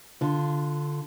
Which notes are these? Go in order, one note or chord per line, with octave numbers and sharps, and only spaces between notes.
D3 F4